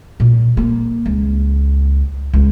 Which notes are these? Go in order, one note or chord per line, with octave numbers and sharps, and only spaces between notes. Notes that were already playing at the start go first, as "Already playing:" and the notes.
A#2
A#3
C#2
C#2